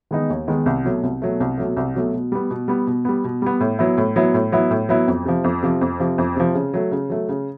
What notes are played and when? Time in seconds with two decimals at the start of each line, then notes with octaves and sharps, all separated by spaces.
0.11 D#3 G#3 B3 D#4
0.30 D#2
0.47 D#3 G#3 B3 D#4
0.66 C2
0.85 B2 F#3 A3
1.03 C2
1.22 B2 F#3 A3
1.40 C2
1.58 B2 F#3 A3
1.77 C2
1.94 B2 F#3 A3
2.14 B2
2.32 G3 B3
2.50 B2
2.68 G3 B3
2.87 B2
3.05 G3 B3
3.24 B2
3.42 G3 B3
3.60 A2
3.79 F#3 B3 E4
3.97 A2
4.16 F#3 B3 E4
4.34 A2
4.52 F#3 B3 E4
4.71 A2
4.89 F#3 B3 E4
5.08 F2
5.25 C3 F3
5.44 F2
5.63 C3 F3
5.81 F2
6.00 C3 F3
6.18 F2
6.36 C3 F3
6.54 C#3
6.74 F#3 A3
6.91 C#3
7.10 F#3 A3
7.28 C#3